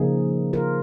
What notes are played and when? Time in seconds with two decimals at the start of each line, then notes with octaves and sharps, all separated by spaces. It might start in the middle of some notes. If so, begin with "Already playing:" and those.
Already playing: C#3 F3 A#3 D#4 G#4
0.53 F4 A#4